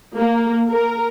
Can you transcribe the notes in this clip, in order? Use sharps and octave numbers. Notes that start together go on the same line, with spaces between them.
A#3
A#4